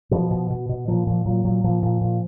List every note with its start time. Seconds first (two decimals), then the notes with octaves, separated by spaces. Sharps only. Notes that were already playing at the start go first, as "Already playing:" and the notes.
0.11 B2 F3
0.31 B2
0.50 B2
0.69 B2
0.88 A#2 F3
1.07 A#2 F3
1.26 A#2 F#3
1.45 A#2 F#3
1.64 A#2 F3
1.83 A#2
2.01 A#2